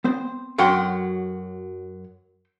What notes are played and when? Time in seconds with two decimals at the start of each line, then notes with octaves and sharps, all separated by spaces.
0.04 B3 C4 C5
0.58 F#2 F#3 A4 F#5 G5 C6